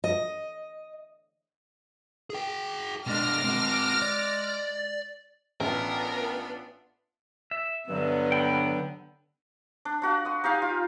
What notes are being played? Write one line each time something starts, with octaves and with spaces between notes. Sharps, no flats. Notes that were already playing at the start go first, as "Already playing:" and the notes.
D#5
G#4 G5
B2 G#3 D4 D6 F6 A#6
G#3 C4 F#4
D5
A1 B3 D4 F4 A#4
E5
G2 D3 F#3 B3
G5 B5
D4
D4 F#4 F#5
D#5 C6
D#4 G4 F5 G#5
F4